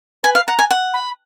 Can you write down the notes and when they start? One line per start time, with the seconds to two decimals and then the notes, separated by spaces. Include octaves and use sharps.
0.23 B4 G#5
0.35 F5
0.47 F#5 A#5
0.59 G#5
0.71 F#5
0.94 B5